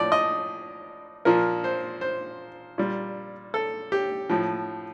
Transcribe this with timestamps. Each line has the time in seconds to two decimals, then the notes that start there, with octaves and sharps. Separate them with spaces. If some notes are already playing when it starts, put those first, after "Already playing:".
Already playing: A2 F3 D5
0.12 D#5
1.25 A#2 F3 A#4
1.64 C5
2.01 C5
2.78 A#2 G3
3.54 A4
3.92 G4
4.30 A2 F3